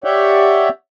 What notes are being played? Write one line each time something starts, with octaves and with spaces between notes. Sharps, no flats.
G4 C#5 D5 E5 F#5 G5